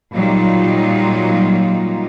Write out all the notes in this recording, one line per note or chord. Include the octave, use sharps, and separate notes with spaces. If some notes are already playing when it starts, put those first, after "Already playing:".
A#2 F#3 G3 D#4 F4